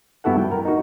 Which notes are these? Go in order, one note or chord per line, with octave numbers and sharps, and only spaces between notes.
G2 B3 E4 F#4 A4 F#5
G5
A#4
D#4 F#4